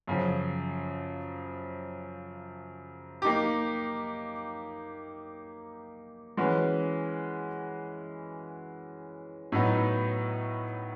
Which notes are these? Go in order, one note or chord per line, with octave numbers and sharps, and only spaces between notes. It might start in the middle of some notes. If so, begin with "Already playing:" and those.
F#2 C#3 F3
A#3 D#4 G4
E3 G#3 C#4 F#4 B4
A2 F#3 B3 D#4